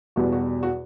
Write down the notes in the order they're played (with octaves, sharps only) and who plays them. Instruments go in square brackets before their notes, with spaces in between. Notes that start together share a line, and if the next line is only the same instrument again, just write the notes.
[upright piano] E2 B2 G3 F#4
F#4
F#4